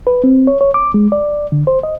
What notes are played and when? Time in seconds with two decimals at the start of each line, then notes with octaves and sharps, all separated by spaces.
0.07 B4
0.24 C4
0.47 C#5
0.61 C#5
0.74 D6
0.94 G#3
1.12 D5
1.52 D3
1.67 C5
1.83 D#5